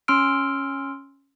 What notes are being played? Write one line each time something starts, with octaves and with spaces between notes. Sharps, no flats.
C#4 C6 E6 F6 D7